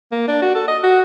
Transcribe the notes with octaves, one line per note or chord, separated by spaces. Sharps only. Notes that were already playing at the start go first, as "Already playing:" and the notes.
A#3
D4
F#4
A4
D#5
F#4